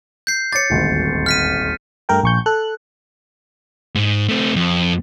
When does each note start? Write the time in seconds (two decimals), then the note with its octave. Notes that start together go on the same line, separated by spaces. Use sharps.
0.27 G6 C7
0.52 C#5 D6 A6 C#7
0.70 D#1 G#1 D2
1.26 F6 B6 D#7
2.09 G2 A3 A#4 G5
2.23 A#1 C#6 G6
2.46 A4 F#6
3.95 G#2
4.29 A3 C4
4.56 F2